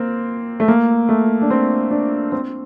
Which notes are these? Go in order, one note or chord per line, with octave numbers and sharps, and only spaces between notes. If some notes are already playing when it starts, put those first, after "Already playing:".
Already playing: A#3 C4
A3
A#3
A3
D4
C4
D4
C4